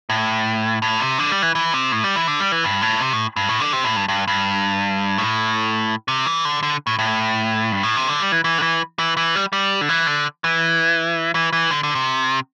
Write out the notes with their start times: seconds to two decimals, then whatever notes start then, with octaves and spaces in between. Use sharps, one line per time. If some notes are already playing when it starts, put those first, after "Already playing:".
0.10 A2
0.82 A2
1.00 C3
1.19 D3
1.32 G3
1.42 E3
1.55 E3
1.74 C3
1.92 A2
2.04 G3
2.16 E3
2.27 D3
2.40 G3
2.52 E3
2.64 G2
2.82 A2
3.01 C3
3.13 A2
3.36 G2
3.49 A2
3.60 D3
3.73 C3
3.84 A2
3.96 G2
4.08 G2
4.28 G2
5.18 A2
6.08 C3
6.26 E3
6.45 D3
6.63 D3
6.87 A2
6.99 A2
7.72 G2
7.83 A2
7.96 C3
8.08 D3
8.20 G3
8.32 E3
8.44 E3
8.58 D3
8.62 E3
8.99 E3
9.17 E3
9.36 G3
9.53 G3
9.81 D3
9.89 E3
10.07 D3
10.44 E3
11.35 E3
11.53 E3
11.71 D3
11.83 D3
11.95 C3